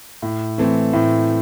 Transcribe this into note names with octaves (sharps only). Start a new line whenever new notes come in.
A2
E3 A3 C4
A2